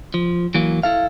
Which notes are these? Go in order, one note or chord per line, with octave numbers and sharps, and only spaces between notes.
F3
E3 F#3 A#3
E4 A4 F5